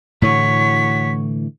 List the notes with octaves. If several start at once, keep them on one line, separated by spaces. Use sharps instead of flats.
A2 D3 E3 F#4 C#5 B6